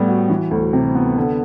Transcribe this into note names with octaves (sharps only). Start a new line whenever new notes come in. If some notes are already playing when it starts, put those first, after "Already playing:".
Already playing: A2 G3 B3
F#4
E3
D2
C3
B3
D3